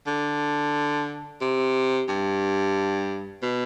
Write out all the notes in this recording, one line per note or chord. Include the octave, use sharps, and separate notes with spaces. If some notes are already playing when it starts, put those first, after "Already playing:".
D3
C3
G2
B2